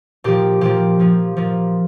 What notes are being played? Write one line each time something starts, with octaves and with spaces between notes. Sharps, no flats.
A#2 F3 G4
A#2 F3 G4
A#2 F3
A#2 F3